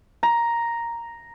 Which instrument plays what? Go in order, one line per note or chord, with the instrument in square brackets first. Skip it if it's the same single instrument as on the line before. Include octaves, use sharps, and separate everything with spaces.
[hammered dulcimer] A#5